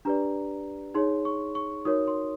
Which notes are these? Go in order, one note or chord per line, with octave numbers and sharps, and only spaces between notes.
D4 G4 B4 D5 A#5
D#4 G#4 C#5 C6
C#6
C#6
D#4 F#4 A#4 C#5 D#6
C6